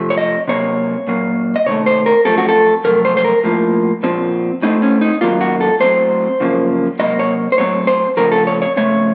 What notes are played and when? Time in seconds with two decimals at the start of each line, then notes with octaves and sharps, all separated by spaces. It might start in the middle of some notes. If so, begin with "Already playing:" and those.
Already playing: F2 C3 F3 A3
0.10 C#5
0.18 D#5
0.48 C3 F#3 A#3 C#5
1.07 A#2 F#3 A#3
1.56 D#5
1.66 C3 D#3 A3 C#5
1.86 C5
2.06 A#4
2.25 F#2 F3 A3 C4 A4
2.38 F#4
2.49 A4
2.84 F2 C3 F#3 A3 A#4
3.05 C5
3.17 C5
3.24 A#4
3.44 A2 F3 A#3
4.03 A#2 F3 C4
4.62 A2 A3 C4 D#4
4.82 C#4
5.01 D#4
5.21 F#2 D#3 F#3 A#3 F4
5.41 F#4
5.61 A4
5.80 A2 F#3 C4 C5
6.40 F#2 C#3 F3 A#3
6.99 C3 F#3 A#3 D#5
7.19 C#5
7.52 C5
7.58 A2 F#3 C4 C#5
7.87 C5
8.17 C#3 F3 A3 C4 A#4
8.32 A4
8.47 C#5
8.62 C#5
8.76 F2 C#3 A3 C4 C#5